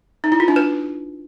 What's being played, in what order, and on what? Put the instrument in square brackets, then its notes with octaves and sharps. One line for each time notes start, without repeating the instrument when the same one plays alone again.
[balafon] D#4
E4
F4
D4
B4